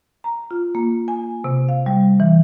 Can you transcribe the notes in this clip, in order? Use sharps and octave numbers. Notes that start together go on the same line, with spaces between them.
A#5
F4
A#3
G#5
C3
F5
G3
E3